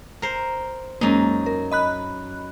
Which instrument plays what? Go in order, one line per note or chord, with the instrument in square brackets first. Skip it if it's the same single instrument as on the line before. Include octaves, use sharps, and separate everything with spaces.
[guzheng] A#4 C5
[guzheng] F#2 D#4 [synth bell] G#3 A#3
[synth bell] A#4
D#5 B5 F#6